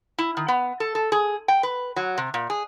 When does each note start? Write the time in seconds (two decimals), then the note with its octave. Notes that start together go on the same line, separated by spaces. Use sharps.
0.18 E4
0.37 D#3
0.48 B3
0.80 A4
0.95 A4
1.12 G#4
1.48 G5
1.63 B4
1.96 F#3
2.18 C3
2.34 A#2
2.50 G#4